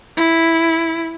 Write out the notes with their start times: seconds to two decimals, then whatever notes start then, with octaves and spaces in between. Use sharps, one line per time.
0.17 E4